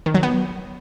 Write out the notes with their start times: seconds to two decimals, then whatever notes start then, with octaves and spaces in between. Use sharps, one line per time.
0.06 D#3
0.15 F#3
0.23 B3